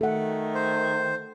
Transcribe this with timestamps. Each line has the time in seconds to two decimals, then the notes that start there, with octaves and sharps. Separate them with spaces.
0.01 D#3 A3 A4 F#5
0.55 C5